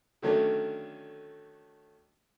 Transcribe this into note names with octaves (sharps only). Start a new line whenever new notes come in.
D3 D#3 F#3 A3 C#4 D4